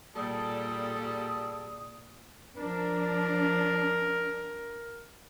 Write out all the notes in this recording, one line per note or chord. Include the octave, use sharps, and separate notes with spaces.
A#2 G3 G#4 A4 D5 D#6
F3 D4 A#4